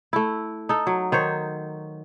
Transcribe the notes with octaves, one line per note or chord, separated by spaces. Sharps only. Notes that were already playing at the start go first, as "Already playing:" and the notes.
A3 E4
D#4 A4
F#3
D#3 C5 C#5